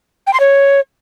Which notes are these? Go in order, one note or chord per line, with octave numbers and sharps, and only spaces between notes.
G5
C6
C#5